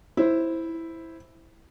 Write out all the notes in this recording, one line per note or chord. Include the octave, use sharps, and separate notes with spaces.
E4 C5